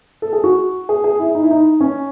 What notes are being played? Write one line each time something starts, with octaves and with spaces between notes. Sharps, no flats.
A4
G#4
F#4
G#4
G#4
E4
D#4
E4
D#4
C#4